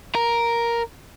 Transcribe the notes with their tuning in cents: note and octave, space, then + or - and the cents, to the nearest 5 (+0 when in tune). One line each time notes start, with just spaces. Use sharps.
A#4 +5